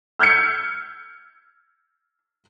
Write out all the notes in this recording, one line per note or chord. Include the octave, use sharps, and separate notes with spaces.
E6 F6 G6 G#6 C#7